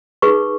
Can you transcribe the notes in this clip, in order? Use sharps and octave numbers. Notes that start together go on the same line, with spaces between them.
D#4 G#4 B4 C#6